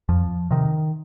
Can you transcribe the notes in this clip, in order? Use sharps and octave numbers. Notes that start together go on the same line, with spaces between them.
F2 F3
C3 D#3